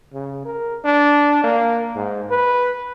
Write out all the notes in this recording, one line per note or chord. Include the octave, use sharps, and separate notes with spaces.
C#3
A#4
D4
A#3
G#2
B4